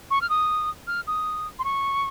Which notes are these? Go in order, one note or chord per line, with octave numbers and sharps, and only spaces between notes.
C#6
F6
D#6
F6
D#6
C6
C#6